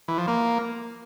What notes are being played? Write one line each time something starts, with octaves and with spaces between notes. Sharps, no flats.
E3
F3
A#3